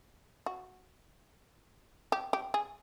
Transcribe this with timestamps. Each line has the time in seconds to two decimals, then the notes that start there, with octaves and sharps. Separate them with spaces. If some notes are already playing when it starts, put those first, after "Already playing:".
0.46 F#4
2.12 G4
2.33 G4
2.54 G#4